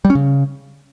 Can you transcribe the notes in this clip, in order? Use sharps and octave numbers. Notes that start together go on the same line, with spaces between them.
G3
C#4
C#3